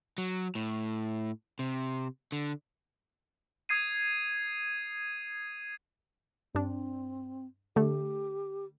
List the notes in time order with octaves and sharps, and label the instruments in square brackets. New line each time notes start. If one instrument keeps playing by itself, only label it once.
[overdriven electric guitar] F#3
A2
C3
D3
[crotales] D#6 G#6 C7 D#7
[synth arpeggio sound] G2 D4 [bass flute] C4
[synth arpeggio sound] D3 A3 [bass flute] G4